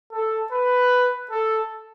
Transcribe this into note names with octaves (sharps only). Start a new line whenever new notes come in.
A4
B4
A4